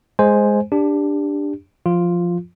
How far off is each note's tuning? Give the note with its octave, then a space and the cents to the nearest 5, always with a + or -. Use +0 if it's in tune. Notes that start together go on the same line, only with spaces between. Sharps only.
G#3 +0 C5 +0 G#5 +0
D4 +0 G4 +20
F3 +0 F4 +0